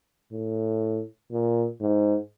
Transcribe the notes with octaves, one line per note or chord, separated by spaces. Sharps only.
A2
A#2
G#2